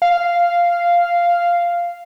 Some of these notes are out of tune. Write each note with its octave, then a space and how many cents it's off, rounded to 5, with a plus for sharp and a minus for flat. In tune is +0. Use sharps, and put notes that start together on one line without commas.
F5 -5